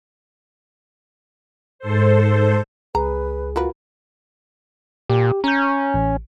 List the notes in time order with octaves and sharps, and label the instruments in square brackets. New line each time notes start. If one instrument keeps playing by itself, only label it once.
[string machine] G#2 A4 C5
[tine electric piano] C#2 [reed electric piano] G#4 [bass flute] B4 [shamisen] A#5
[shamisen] A#3 A#4 B4 [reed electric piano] F4 F#4
[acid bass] A#2 [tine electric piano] G4
[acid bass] C#4 [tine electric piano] A#5 G6
[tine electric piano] A1